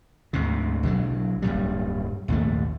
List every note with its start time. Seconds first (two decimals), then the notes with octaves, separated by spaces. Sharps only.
0.33 D2 G#2 C3
0.83 B1 D3 D#3 F#3
1.42 D1 G2 A#2 G3
2.28 A#1 D#2 G#2 A3